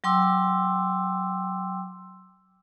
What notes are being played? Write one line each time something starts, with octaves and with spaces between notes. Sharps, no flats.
F#3 G5 C6 D6 E6